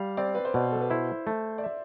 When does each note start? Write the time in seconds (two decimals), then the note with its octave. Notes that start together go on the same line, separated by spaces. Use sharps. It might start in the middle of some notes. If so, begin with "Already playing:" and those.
Already playing: G3 F5
0.17 C4 D5
0.35 B4
0.45 C5
0.54 B2 D5
0.72 A4
0.81 B4
0.90 E4 C5
1.27 A3
1.58 D5
1.63 E5